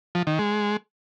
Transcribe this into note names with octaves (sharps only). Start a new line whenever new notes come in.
F3
D#3
G#3